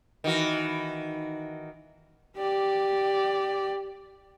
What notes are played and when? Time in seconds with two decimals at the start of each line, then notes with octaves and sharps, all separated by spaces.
0.24 D#3 E3 F#4
2.37 G4 D5